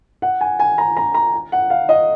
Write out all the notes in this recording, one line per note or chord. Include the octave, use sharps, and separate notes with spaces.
F#5
G#5
G#5
A#5
A#5
A#5
F#5
F5
D#5